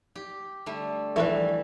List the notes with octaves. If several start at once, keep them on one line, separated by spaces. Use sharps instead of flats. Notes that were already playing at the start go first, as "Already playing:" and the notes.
G4
D3 G3 A3
E3 F3 G3 A3 E4 B4